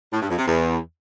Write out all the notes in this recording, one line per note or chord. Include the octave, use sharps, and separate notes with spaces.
A2
G2
F2
C3
E2